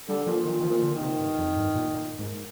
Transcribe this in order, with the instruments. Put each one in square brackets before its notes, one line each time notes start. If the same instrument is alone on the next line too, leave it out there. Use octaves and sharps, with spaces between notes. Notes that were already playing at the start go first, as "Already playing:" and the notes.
[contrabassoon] D3 [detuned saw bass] G3
[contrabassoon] A#2 [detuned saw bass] F3
[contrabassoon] A#2 [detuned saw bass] D#3
[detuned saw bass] D#3
F3
[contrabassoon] A#2
[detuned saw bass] D3
[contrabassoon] D#3
[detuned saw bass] C3
G2
F2
G2
A#2
A#2
G#2